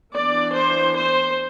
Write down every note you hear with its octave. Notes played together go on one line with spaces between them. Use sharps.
E3 B3 D4 D5
C5
C5